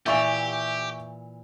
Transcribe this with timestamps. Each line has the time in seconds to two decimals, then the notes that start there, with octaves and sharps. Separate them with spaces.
0.06 A#2 E3 G4 E5 C#6 F7